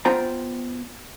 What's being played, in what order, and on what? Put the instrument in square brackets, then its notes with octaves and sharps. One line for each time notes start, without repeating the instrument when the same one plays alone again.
[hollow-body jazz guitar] B3 F4 C5 G5 A#5